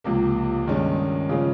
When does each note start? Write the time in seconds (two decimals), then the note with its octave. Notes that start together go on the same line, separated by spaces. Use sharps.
0.04 C#2 C3 F3 A#3
0.67 G2 D#3 G#3 C#4
1.29 C#3 F3 G#3 C#4